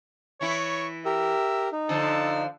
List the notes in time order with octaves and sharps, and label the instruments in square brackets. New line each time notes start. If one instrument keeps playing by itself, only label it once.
[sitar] E3 E4 [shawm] C#5 [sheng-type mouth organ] C#6
[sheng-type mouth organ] G4 A#4 [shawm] E5
[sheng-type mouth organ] D#4
[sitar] D3 F3 [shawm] A4